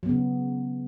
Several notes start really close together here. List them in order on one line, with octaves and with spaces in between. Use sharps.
F#3 B3 C#3